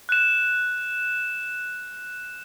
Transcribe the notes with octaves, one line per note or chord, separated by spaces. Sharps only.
F#6 E7